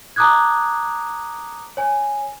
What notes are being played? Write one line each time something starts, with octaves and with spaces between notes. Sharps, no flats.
A5 A#5 D6 D#6 F#6 G#6
C#5 G#5